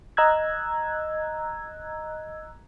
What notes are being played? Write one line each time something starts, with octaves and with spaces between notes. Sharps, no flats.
D#5 A#5 E6 F#6 G#6